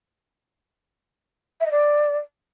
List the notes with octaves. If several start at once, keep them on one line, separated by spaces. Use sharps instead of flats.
E5
D#5
D5